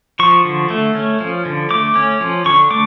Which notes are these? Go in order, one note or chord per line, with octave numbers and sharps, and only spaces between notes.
F3 C#6
D3
A3
C#4
F3
D3
A3 D6
C#4
F3
D3 C#6
A3 D6